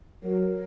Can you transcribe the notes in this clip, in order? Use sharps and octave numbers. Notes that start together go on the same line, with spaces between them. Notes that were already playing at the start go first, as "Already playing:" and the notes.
F#3 A#4